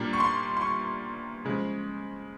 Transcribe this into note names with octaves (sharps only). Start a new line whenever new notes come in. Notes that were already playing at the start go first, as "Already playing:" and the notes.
Already playing: A#2 G3 A#3 D4
C#6
C6
C6
C#6
C#3 F3 G#3